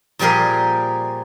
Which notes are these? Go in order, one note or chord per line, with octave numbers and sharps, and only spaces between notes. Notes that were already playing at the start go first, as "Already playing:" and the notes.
A#2 F3 G3 G4 G#4 A#4